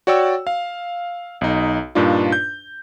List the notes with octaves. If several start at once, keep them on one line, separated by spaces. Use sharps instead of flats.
F#4 C#5 D5 G5 E6
F5
B1 D#4
G2 A#2 D4 D#4 F4
G6